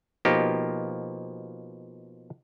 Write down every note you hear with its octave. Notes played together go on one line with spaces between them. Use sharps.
B2 F3 A#3 D#4 G4